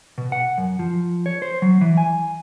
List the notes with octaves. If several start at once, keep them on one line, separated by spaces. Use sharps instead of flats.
B2
F#5
F#2
F3
C#5
C5
F#3
E3
G#5